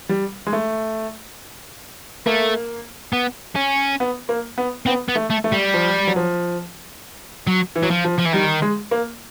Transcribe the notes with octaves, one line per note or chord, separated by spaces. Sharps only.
G3
G#3
A3
A3 A#3
B3
C#4
B3
A#3
B3
B3 C4
B3
A3
A3
A3
G3
F3
F#3
F3
F#3
E3
F#3
F3
F3
F3
E3
D#3 G3
G#3
A#3